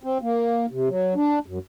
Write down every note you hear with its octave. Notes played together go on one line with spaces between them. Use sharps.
C4
A#3
C3
F#3
D4
F#2